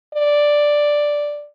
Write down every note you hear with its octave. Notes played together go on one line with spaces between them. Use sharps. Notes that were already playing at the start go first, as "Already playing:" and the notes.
D5